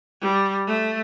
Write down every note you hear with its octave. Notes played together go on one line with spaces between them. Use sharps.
G3
A3